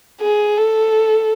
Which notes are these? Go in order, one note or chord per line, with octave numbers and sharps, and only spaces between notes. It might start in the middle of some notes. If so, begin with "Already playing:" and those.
G#4
A4